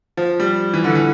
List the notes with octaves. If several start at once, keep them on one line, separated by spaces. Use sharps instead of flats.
F3
G3
E3
D3
E3